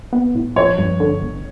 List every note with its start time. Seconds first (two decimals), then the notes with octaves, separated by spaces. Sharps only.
0.13 B3
0.35 A2
0.56 F3 C#5
0.78 G2
1.00 D3
1.21 G1